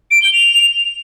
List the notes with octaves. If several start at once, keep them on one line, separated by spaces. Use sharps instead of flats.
D7
G7
F7